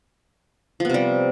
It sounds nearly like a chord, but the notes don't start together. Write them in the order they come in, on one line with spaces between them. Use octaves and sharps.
F3 B3 C3 G3